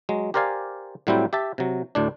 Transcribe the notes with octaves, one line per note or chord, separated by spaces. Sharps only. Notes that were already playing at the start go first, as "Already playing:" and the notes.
F#3 G#3
G4 A#4 C5 D5 F5 G#5
A2 F#3 G3 C4 E4 G5
G4 E5 A5
C3 F#3
D2 A2 D4